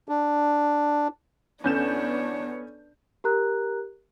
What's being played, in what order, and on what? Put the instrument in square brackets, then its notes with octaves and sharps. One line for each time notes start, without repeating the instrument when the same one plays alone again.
[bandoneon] D4
[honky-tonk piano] E2 G6 E7 [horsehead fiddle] B3 C#5 [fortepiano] C#4 A4 [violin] D4
[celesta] G4 A#4 A#5 F#6